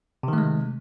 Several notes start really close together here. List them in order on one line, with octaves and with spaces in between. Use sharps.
C3 D#3 A3 G#3